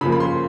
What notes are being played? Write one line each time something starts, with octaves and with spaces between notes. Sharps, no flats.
C#3 F3 A#3 B5
B5
C6